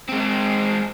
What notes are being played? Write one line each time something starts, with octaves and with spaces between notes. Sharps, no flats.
G#3 C4